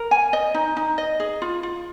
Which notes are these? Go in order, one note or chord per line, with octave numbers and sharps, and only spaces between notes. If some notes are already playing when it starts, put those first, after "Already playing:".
Already playing: A#4
G#5
D#5
D#4
D#4
D#5
G#4
F4
F4